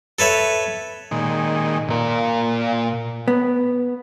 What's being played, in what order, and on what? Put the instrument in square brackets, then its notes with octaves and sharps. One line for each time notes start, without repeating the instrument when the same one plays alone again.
[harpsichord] A4 B4 C#5 E5
[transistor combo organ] A#2 D#3 G#3
[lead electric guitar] A#2 A#4
[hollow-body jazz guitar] B3